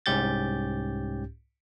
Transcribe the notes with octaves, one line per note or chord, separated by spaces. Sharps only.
C2 G#2 C#4 G4 G6 A6